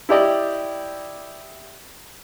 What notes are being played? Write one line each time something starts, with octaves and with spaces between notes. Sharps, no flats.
E4 G4 D5 D#5